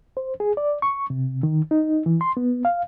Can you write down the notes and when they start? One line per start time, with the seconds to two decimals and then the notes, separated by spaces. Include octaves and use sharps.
0.17 C5
0.40 G#4
0.57 D5
0.82 C#6
1.10 C3
1.43 D#3
1.71 D#4
2.06 E3
2.21 C6
2.37 B3
2.65 F5